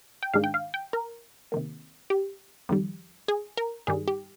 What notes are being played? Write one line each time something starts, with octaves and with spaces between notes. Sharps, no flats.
G5
G#2 D#3 G#3 D4 F5
G5
F5
G5
A#4
C3 D#3 A#3
G4
F2 D#3 G3
G#4
A#4
G2 D#3 G3 G#4
G4